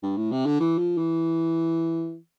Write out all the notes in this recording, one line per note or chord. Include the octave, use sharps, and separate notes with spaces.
G2
A2
C3
D3
E3
F3
E3